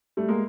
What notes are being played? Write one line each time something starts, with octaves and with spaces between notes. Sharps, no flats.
G3 A3
G#3 A#3